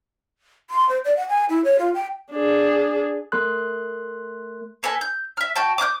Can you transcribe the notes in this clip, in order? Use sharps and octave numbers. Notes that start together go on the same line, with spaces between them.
C6
C5
D5
F#5
G#5
E4
C#5
F4
G5
D4 G#4
A3 A#4 C6 F#6
A#3 A4 B4 G#5
G6
E5 F6
F#4 G5 A5
D6 D#6 F#6 G6